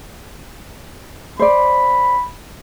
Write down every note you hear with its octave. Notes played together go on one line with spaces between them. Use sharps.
C5 D5 B5